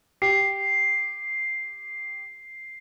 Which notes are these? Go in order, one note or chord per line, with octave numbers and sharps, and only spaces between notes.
G4 C7